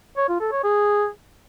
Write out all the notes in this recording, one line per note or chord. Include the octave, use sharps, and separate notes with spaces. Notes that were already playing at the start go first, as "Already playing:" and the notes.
C#5
F4
A4
C#5
G#4